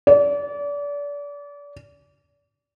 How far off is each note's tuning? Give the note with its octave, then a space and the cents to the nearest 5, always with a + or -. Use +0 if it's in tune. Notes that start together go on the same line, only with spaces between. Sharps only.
D5 -30